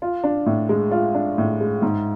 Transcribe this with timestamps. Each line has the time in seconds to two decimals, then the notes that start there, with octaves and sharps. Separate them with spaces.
0.02 F4
0.24 D4
0.46 A2
0.69 G#3
0.91 F4
1.14 D4
1.38 A2
1.60 G#3
1.82 G#2